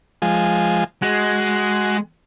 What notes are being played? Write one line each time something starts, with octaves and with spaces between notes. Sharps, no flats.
F3 G#3
G#3 F#4